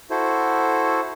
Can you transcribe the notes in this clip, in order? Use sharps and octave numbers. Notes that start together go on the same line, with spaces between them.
E4 F#4 A4 C5